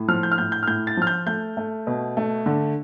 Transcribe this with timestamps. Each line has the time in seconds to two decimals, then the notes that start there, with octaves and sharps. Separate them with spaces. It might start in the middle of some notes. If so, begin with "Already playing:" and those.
Already playing: A2
0.08 F3 F6
0.23 G6
0.32 F6
0.38 A2 G6
0.52 G6
0.63 F6
0.67 A2 G6
0.87 A6
0.97 F3 F6
1.07 G6
1.26 A3 G6
1.57 A3
1.87 B2
2.17 A3
2.46 D3